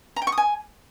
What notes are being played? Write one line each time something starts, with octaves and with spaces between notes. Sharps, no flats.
A#5
G5
C#6
D#6
G#5